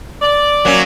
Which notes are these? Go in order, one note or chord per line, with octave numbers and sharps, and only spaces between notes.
D5
F#3 A#3 C#4